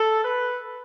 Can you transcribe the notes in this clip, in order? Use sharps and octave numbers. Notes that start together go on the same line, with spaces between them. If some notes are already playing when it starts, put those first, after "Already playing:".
Already playing: A4
B4